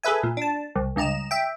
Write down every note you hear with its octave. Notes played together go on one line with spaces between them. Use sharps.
G#4 A4 B4 E5 G#5
A#2
D4 A5
C2
C#2 G2 D#5 A#5 E7
E5 G5